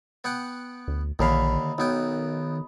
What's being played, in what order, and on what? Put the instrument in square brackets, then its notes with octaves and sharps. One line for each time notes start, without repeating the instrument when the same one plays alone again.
[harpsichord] B3 F#5 G5
[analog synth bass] D2
[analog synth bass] A#1 [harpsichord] D#2 D3 F5 [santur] D#5 A#5 B5
[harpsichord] B1 B3 G5 [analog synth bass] D#3